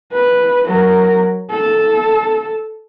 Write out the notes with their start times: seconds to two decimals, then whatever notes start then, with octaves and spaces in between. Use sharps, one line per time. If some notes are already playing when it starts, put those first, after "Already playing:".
0.12 B4
0.66 F#3 A#4
1.50 A4